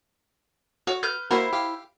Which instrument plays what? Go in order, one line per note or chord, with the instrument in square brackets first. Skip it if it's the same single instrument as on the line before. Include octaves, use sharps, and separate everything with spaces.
[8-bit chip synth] F#4 [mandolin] C#5
[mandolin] B4 F6 G6
[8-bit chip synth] A#3 F#4 A#4 [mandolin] E4 C5
[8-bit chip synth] G4 F5